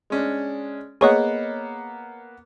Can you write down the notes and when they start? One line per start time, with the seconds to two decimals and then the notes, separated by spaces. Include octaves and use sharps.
0.10 G#3 C#4 D4
1.01 A#3 B3 G#4 C#5 D#5 F#5